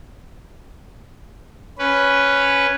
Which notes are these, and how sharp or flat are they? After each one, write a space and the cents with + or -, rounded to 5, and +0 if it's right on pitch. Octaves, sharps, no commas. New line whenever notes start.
C#4 +0 B4 +0